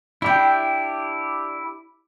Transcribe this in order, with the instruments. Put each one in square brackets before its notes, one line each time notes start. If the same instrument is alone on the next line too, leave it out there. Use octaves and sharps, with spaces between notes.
[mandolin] D4 G5 [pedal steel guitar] E4 G4